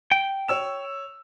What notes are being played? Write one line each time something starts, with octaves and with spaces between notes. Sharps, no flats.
G5
C#5 E6 E7